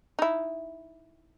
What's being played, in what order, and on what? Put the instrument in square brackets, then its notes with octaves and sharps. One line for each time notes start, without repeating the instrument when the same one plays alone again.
[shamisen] D#4 E4